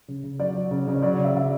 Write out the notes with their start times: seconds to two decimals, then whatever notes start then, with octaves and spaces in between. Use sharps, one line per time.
0.08 C#3
0.23 C#3
0.39 F#3 D5
0.55 F#3
0.71 C#3
0.87 C#3
0.94 C#5
1.03 F#3 D5
1.19 C#3
1.24 E5
1.35 C#3 E5